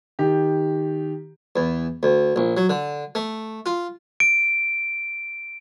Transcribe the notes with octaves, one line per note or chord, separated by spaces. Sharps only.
D#3 G4
E2
D2
A#1
F#3
D3
A3
F4
D7